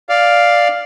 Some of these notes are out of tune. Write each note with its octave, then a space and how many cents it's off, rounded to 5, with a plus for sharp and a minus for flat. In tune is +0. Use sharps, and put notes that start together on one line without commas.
D5 +0 F5 +0